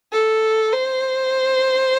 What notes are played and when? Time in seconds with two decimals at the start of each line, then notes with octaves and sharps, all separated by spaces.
0.12 A4
0.73 C5